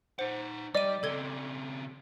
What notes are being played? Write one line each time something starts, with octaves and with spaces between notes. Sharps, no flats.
D#4 C5 F#5
G3 D5 D#5 D#7
C#3 C4 A4 G#6 G7